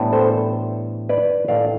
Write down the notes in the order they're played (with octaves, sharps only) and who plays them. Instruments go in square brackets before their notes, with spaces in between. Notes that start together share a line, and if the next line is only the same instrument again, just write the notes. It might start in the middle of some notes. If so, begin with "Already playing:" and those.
Already playing: [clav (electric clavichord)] A2 E3 G3 B3 D4
A4 C5
B4 D5
A2 E3 A3 D4 D5 F5